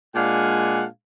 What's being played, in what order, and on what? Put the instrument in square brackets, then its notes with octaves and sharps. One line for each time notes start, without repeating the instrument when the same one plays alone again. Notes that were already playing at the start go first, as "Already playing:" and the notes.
[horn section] A#2 G#3 D4 F5 F#5 G#5